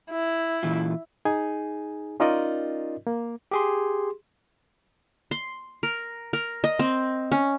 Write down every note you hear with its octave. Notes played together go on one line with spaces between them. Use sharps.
E4
A#2 E3 F4
D#4 G#4 G#5
C#4 D#4 F4 A#4 D5 D#5
A#3
G4 G#4 C6
C6
A#4
A#4
D#5
C4
C#4